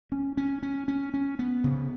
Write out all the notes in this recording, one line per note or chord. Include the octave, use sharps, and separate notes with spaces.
C#4
C#4
C#4
C#4
C#4
B3
C#3